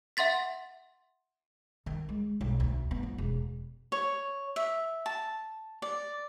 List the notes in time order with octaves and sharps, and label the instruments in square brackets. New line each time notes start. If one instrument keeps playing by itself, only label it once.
[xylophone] E5 F#5 C6 A6 B6
[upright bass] D#3
G#3
B1
D2
B3
F3
E1
[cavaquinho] C#5
E5
A5
D5